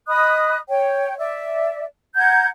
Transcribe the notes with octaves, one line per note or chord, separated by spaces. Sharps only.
D#5 B5 D#6 F#6
C#5 G5
D5 E5
F#5 A#5 G6 G#6